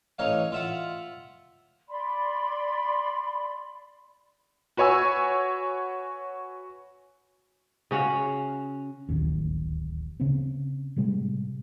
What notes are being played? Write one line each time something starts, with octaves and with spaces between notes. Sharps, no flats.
A1 D#4 C#5 F5
F4 E5 F#5
D5 B5 C6
F#4 B4 C#5 G#5 E6
C#3 C#4 F#4 F5
D1 A1 D#2
C#3 B3 C4
A2 C3 G3 G#3